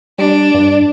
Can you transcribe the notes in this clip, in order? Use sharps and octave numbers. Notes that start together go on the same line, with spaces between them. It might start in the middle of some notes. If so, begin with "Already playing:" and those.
G3 D4
G2